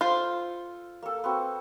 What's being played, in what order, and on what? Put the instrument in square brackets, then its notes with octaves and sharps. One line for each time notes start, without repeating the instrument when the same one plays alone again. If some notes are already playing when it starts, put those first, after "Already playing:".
[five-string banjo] F4 C5 [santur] A4
[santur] A#3 A4
B3 C4 F#4